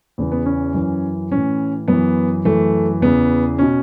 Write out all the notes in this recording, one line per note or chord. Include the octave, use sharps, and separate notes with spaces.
E2 C#3 E3
B3
C#4
F#2 E3
A2 E3 C#4
F#2 E3 B3
F#2 E3 A3
E2 C#3 E3 B3
B2 C#4